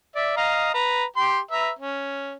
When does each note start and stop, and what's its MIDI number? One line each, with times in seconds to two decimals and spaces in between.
0.16 0.34 74
0.16 0.34 76
0.37 0.70 75
0.37 0.70 77
0.37 0.70 82
0.74 1.04 71
0.74 1.04 82
1.17 1.39 67
1.17 1.39 79
1.17 1.39 84
1.51 1.71 71
1.51 1.71 76
1.51 1.71 82
1.79 2.37 61